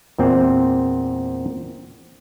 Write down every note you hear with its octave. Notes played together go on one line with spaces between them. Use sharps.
E2 A#2 C4